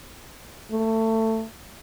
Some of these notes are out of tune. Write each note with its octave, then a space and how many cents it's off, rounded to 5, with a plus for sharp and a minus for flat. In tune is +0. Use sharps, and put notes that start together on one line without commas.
A3 +20